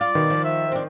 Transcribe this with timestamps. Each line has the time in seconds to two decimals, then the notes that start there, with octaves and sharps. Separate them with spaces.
0.01 F4 D5
0.15 B2 D#3
0.30 F3
0.45 E5
0.72 C4 D4